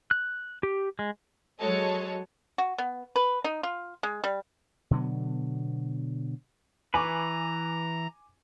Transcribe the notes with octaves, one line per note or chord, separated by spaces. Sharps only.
F#6
G4
G#3
F#3 G#3 F#4 A4 C#5 D#5
F#4
B3
B4
D#4
F4
G#3
G3
B2 D3 F#3 B3
E3 B4 G#5 A#5 B5 C#6 D6